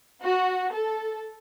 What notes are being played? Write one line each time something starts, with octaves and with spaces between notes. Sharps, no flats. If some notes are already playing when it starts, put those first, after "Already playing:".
F#4
A4